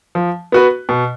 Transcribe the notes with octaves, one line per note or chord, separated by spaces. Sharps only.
F3
B3 F#4 B4
B2